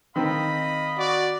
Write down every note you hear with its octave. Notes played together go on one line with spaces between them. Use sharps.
D#3 C4 D#5 F5 B5
F#4 D5